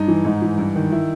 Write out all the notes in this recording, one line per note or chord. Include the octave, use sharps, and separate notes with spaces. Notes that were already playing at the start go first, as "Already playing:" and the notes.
Already playing: G2 D#4
E3
G#2
E3
G2
D#3
E4